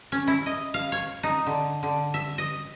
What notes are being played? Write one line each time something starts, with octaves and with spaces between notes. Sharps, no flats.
C#4
E4
D#5
F5
C#5
D#4
D3
D3
E5
D#5